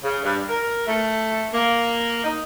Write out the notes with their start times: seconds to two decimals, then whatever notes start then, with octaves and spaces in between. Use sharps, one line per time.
0.03 C#3
0.23 G2
0.48 A#4
0.85 A3
1.53 A#3
2.24 D#4